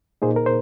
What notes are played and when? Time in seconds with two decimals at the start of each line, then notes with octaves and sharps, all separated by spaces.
0.22 A#2 A#3 D#4 G#4 C5
0.36 A#4
0.46 C5